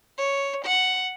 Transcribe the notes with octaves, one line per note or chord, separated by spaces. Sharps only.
C#5
F#5